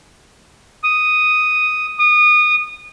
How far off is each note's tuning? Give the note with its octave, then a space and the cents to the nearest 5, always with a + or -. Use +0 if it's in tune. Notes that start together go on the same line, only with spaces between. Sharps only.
D#6 +0
D#6 -25